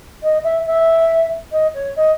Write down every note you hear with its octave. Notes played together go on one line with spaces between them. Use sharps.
D#5
E5
E5
D#5
C#5
D#5